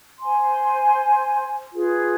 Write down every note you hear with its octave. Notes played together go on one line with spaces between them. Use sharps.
C5 G#5 C6
F4 G#4 B4